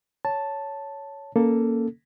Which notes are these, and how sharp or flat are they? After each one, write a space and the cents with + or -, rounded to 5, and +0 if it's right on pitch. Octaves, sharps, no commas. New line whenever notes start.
C#5 +10 A5 +0
A#3 +0 C#4 +0 A4 +5